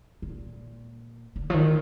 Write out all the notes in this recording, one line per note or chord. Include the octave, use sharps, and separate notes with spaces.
A#2
D3
F3
D#3